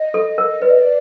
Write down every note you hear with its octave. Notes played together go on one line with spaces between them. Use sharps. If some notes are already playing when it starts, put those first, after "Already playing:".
Already playing: D#5
A4
A#4
B4 D5
D#5
D5